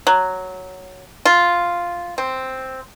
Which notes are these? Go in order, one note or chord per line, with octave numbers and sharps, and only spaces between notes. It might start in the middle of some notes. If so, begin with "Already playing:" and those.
F#3
F4
C4